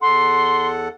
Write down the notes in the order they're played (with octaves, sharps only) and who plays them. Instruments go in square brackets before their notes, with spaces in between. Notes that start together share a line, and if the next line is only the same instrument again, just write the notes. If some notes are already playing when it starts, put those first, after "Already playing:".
[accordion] E2 A4 F#5 [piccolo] C6